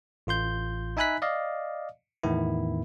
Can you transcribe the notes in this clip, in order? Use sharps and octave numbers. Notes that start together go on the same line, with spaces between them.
A1 F4 C6 G6
D#4 E5 G#5 B5 F#6 B6
D5 D#5 F5
E2 A2 D#3 B3 E4